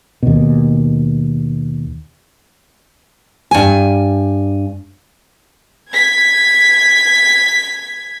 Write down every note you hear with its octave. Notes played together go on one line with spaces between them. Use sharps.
D#2 B2
G2 G#5
G#6 B6